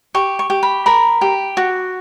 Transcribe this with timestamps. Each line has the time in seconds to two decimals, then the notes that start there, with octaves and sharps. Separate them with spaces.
0.14 G4 C#6
0.39 C#6
0.50 G4
0.63 B5
0.86 A#4 B5
1.21 G4
1.57 F#4